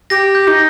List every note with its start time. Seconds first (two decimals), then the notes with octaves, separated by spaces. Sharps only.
0.10 G4 A#6
0.35 G6
0.48 D#4